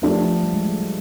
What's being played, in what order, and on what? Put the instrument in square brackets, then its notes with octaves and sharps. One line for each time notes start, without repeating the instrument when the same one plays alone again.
[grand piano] F3 A3 D4 G4 [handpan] B3
[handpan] G3
G#3
A3
G3